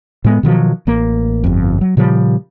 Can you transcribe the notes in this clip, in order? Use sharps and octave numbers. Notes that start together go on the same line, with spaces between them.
A2 G#3 B3
B2 D#3 F3 F#3
A1 A#3
G1 F2
F#3
A#2 C#3 F3 G3